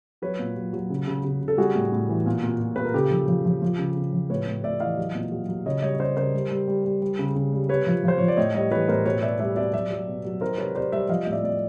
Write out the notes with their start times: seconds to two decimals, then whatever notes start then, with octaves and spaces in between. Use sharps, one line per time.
0.22 F#3 B4 C#5
0.39 A#2
0.56 F#3
0.73 F#3
0.90 C#3
1.07 C#3
1.24 C#3
1.41 C#3
1.48 A4
1.58 G3 F#4 G#4
1.75 A2
1.92 A2
2.09 E3
2.26 A#2
2.43 A#2
2.60 A#2
2.76 A#2 B4
2.85 A#4
2.94 C#3 G4 A4
3.11 F3
3.28 F3
3.45 F3
3.62 F3
3.79 C#3
3.96 C#3
4.13 F3
4.30 A2 B4 C#5
4.47 A2
4.64 A2 D5 E5
4.80 E3 D#5 F5
4.97 F#3
5.15 A#2
5.32 F#3
5.49 F#3
5.66 C#3 C#5 D#5
5.83 G3 C#5 D#5
5.94 C#5
5.99 C#3 C5 D5
6.17 C#3 A#4 C5
6.34 G3
6.51 G3
6.68 G3
6.85 G3
7.02 G3
7.19 C#3
7.35 C#3
7.53 G3
7.69 C3 B4 C#5
7.87 F3
8.04 F3 C5
8.18 F3 C#5
8.28 D5
8.37 A2 C#5 D#5
8.54 G3 C#5 D#5
8.71 E3 B4 C#5
8.88 A2 A#4 C5
9.05 B2 B4 C#5
9.22 B2 D5 E5
9.40 G3 D5 E5
9.56 B2 D5 E5
9.73 F#3 D5 E5
9.90 F#3
10.07 B2
10.25 F#3
10.41 D#3 A#4 C5
10.58 C3 B4 C#5
10.75 C3 C5 D5
10.92 G3 D5 E5
11.09 F3 D#5 F5
11.25 A2 D#5
11.32 D5 E5
11.44 A2 D5